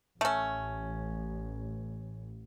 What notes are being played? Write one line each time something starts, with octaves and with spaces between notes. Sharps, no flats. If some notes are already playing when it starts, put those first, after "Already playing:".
A1 A3 C#4